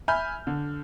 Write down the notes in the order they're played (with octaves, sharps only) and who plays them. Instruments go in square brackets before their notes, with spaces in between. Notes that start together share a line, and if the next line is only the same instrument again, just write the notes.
[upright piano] E5 G#5 B5 F6 G6
D3